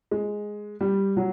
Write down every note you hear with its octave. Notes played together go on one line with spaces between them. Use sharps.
G#3
G3
F#3